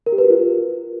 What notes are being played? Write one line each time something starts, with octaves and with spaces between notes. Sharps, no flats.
A#4
G4
B4
F#4
F4